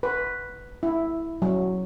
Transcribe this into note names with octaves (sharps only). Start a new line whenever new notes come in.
B4
E4
F#3